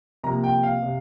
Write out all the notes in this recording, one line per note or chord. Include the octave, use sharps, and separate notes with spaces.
C3 F3 A#3 A#5
G5
F5
C3